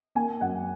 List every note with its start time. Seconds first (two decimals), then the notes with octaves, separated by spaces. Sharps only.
0.15 A#3 G#5
0.41 F#2 F#5